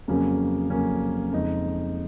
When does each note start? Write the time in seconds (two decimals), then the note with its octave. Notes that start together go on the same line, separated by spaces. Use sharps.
0.08 F2 C#3 F#3 A#3 C#4
0.70 F2 C#3 F#3 A#3 C#4
1.32 F2 C#3 G#3 D#4